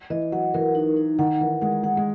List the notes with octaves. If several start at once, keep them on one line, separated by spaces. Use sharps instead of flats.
E3 D#5
F#3 F#5
E3 A#4
D#4
D#4
D#3 F#5
E3 A#4
G#3 F#5
G#3 F#5
G#3